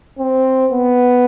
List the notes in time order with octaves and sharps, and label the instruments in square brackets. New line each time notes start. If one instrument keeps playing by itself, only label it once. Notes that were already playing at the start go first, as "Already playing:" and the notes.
[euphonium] C4
B3